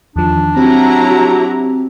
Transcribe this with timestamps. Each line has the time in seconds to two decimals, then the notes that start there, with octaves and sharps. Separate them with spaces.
0.16 E2 D#3 F3 D4
0.56 F#3 C4 E4 G4 A#5